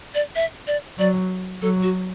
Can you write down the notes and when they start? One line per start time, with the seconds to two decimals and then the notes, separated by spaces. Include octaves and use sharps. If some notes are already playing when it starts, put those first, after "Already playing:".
0.15 D5
0.35 E5
0.67 D5
0.98 F#3 D5
1.62 F#3 A4
1.82 F#4